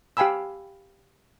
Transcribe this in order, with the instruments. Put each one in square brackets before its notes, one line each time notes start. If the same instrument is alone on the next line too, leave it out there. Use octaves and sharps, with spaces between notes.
[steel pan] G4 F5 G5 G#5 B5 E6